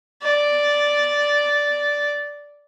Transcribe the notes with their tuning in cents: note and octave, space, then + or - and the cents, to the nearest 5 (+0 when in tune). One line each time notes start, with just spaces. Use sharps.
D5 -5